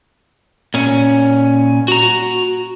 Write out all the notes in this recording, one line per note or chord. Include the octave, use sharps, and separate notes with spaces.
A#2 C#4
F#4 A#5